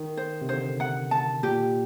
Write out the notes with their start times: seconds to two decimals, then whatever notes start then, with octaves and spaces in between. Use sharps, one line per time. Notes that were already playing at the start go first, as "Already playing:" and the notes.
Already playing: D#3
0.17 C5
0.41 C3
0.48 D3 C5
0.80 F#5
1.11 A5
1.43 A#2 G4